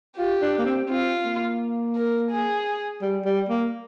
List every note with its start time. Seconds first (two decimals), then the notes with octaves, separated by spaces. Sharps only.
0.18 F4 G4
0.42 D4
0.59 A#3
0.66 C4
0.89 C4 F4
1.25 A#3
1.96 A#4
2.31 G#4
3.02 G3
3.25 G3
3.49 A#3